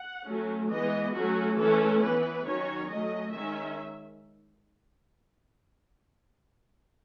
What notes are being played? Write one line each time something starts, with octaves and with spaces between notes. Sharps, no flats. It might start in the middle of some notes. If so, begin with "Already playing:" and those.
Already playing: F#5
F#3 A3 C#4
E3 G#3 B3 D#5
F#3 A3 C#4 F#4
E3 A3 C#4 A4
E3 B3 B4
D#3 F#3 C#4 C#5
F#3 A3 C#4 D#5
D#3 G#3 C#4 E5